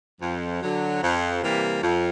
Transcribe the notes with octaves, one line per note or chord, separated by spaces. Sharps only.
F2
D3 F#3
F2
C3 E3 G3 A#3
F2